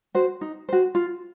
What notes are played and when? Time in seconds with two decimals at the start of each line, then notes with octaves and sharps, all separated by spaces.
0.15 F#4 C5
0.41 D#4
0.69 F#4 C5
0.95 F4